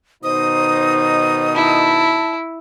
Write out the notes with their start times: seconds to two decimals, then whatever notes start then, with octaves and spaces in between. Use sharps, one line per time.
0.24 B2 D#3 D#4 C5 D#6
1.55 E4 A5